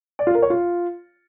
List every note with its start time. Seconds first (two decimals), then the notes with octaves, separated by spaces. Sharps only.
0.19 D5
0.27 F4
0.35 A#4
0.42 C#5
0.50 F4